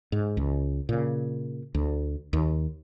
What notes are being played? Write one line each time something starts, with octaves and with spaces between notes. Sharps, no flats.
G#2
C#2
A#2 C#3
D2
D#2